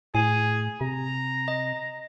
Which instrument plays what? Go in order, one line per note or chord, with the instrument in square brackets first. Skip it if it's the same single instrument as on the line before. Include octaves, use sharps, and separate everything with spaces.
[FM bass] A2 [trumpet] G#4 [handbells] G#5
[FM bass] C3 [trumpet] A#5
[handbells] D#5